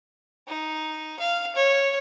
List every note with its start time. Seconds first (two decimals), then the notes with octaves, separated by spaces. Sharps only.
0.48 D#4
1.19 F5
1.56 C#5